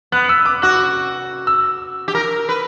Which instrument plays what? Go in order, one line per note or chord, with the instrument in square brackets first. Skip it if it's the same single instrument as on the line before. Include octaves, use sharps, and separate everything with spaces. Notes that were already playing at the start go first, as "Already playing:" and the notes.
[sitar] B3 [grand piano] F#6
[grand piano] E6
D6
[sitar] F#4 [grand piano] F#6
[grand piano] E6
[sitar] G4
A#4
B4